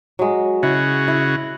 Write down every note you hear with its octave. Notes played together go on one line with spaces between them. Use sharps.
F#3 G#3
C#3 E4 F#4
E4